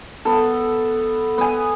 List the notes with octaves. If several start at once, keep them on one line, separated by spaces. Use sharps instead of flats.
B3 A4
B3 G#5